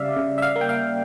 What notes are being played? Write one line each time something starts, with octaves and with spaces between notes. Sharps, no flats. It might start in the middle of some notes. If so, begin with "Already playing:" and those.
Already playing: C#3 G3 D5 E5 F5
C#3
E5
F5
A#3
G5
F5